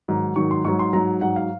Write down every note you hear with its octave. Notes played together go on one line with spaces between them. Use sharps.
G#2 D#3 F#3
G#2 D#3 F#3 C#6
C6
G#2 F#3 C#6
C6
G#2 F#3 A#5
G#2 F#3 F#5
F5